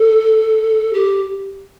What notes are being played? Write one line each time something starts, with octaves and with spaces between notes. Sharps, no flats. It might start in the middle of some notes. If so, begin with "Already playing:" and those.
Already playing: A4
G4